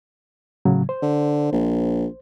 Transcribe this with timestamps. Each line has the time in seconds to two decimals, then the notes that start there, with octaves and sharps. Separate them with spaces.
0.65 A2 C#3 F#3
0.89 C5
1.02 D3
1.52 A#1